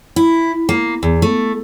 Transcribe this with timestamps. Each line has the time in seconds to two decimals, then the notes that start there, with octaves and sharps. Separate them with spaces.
0.16 E4
0.69 A#3
1.03 E2
1.22 A3